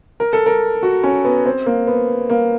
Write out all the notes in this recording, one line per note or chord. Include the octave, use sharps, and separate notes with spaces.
A#4
A4
A#4
F#4
C#4
B3
C4
A#3
B3
A#3